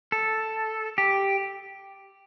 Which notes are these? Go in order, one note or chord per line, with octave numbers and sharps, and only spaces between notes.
A4
G4